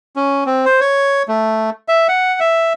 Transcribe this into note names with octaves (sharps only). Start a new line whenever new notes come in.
C#4
C4
C5
C#5
A3
E5
F#5
E5